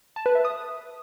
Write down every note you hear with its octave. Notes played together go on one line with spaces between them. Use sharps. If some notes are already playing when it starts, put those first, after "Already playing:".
A5
B4
E5
D#6